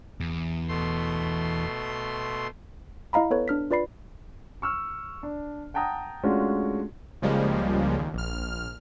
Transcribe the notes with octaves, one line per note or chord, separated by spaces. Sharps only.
E2
B2 A3 C6
E4 D#5 F5 A#5 B5
B3 A4 B4 C#5
D4 F6 B6
F4 B4 D5 B5 C7
C#6 E6 F6
D4
F#5 G5 A5 A#5 D#6
G#3 A3 C#4 D4 F4 F#4
C#2 C#3 F3 G3 G#3 A#3
D#2
A#1 F6